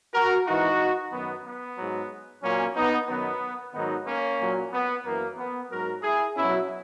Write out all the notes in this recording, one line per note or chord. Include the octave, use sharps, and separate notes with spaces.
F#4 A#4
G#2 E3 D#4 F#4
F#2 D#3 F#3 B3
B3
G#2 F#3
A#2 F#3 A#3 C#4
B3 D#4
F#2 D#3 F#3 B3
G#2 D#3 F#3 B3 D#4
A#3 C#4
A#2 F#3
B3
F#2 E3 A#3
B3
G#2 F#3 F#4 A#4
E4 G#4
B2 F#3 C#4 E4